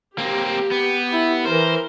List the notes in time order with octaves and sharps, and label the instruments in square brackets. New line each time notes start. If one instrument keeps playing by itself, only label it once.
[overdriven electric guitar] A#3 C4 [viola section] G4
[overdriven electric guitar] B3
[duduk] E4
[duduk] E3 [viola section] A#4 [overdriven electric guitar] C5